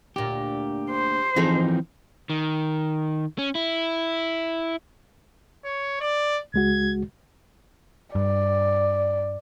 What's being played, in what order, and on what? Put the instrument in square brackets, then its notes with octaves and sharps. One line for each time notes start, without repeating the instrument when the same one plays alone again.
[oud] D2 A#2 [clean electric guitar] G4
[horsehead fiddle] C5
[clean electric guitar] E3 F3 C4 [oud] D#4 G#4 A4
[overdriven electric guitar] D#3
C#4
E4
[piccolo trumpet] C#5
D5
[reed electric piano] C#2 G#3 F#4 [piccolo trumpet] G#6
[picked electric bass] G2 [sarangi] D5